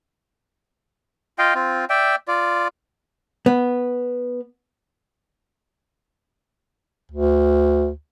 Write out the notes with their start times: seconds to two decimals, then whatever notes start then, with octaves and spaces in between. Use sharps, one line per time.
1.39 F4 D#5 F5 G5
1.55 C4 F4
1.90 D5 E5 G5
2.28 F4 D5
3.46 B3
7.12 D2